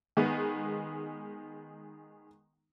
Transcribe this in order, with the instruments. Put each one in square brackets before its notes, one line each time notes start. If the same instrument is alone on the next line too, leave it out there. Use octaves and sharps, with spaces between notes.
[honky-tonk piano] D#3 G#3 B3